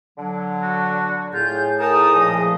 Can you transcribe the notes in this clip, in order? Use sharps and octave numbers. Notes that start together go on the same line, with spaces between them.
D3 F#3
F#4
A2 F4 G#4 G6
D#4 A#4 A5 D#6
A#2 F3 D#5